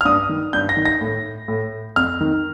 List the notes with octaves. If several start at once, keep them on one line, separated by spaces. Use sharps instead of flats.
F6
G2 D#6
D#3
G2 G6
A#6
D#3
A#6
A2
A2
F2 F6
D#3